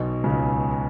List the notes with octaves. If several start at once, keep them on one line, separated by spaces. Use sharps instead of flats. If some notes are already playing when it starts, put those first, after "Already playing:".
Already playing: B1 B2
C#2 C#3